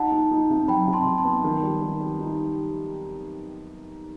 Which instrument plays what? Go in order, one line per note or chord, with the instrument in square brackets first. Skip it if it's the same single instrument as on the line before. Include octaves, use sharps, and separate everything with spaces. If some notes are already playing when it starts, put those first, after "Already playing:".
Already playing: [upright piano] D#4 [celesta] F#5 A5
[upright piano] D#4
D#4
C3
[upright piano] F#3 [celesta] G5 B5
[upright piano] C3
[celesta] A5 C6
[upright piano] C3
[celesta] A5 C6
[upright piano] B3
D#3
G3
D#3
G3
D#4